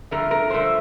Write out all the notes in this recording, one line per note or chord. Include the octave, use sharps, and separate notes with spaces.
G2 D3 F3 A3 A#4
A#4
G2 D3 F3 A3 C5